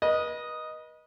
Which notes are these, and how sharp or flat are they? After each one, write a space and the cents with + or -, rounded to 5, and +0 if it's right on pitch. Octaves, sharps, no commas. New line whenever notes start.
B4 -35 D#5 +0